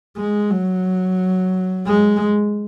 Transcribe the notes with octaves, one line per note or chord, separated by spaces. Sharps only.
G#3
F#3
G#3